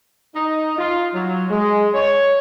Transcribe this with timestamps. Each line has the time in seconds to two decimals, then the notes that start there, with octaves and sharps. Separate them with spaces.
0.35 D#4
0.78 F4
1.14 F#3
1.49 G#3
1.94 C#5